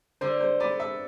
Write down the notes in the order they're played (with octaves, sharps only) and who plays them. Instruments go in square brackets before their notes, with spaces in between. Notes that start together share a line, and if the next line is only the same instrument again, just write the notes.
[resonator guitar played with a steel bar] D3 [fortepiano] C5
[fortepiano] C5
[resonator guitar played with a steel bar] B3 [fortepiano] D5
[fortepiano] E5